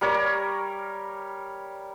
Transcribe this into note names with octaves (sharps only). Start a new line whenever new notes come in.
G3 A#4 C#5